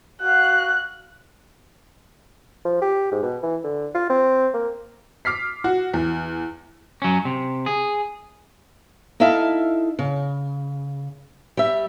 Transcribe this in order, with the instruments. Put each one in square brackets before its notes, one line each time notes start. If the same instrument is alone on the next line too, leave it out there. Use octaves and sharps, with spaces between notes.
[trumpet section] F#4 F5 [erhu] F#6
[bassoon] F3
G4
G#2
B2
E3
D3
F4
C4
A#3
[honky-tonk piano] D6 F6 B6 C7
F#4
E2
[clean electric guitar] F#3 C#4
C3
G#4
[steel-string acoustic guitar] D#4 E4 A4 E5 F5
C#3
G3 E5